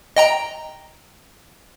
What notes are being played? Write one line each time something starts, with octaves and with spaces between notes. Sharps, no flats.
D#5 G5 A#5